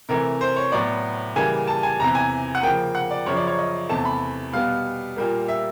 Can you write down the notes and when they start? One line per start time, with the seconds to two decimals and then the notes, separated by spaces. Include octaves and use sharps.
0.09 C3 E3 A3 A#4
0.41 C5
0.56 C#5
0.72 A2 F#3 B3 D5
1.36 C#3 E3 G3 A#3 G#5
1.67 A5
1.83 G#5
1.99 E2 C3 E3 A#5
2.15 G#5
2.55 F#5
2.63 C#3 F3 A#3 G5
2.95 F#5
3.11 D5
3.26 F#2 C#3 F3 C#5
3.37 D5
3.47 C#5
3.59 D#5
3.89 E2 C3 E3 A3 A5
4.05 B5
4.53 B2 G3 B3 F5
5.16 A#2 G3 A#3
5.48 E5